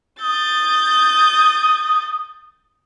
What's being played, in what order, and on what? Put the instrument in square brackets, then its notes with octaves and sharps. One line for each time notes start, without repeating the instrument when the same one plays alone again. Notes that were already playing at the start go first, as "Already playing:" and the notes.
[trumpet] D#6 [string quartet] G6 A6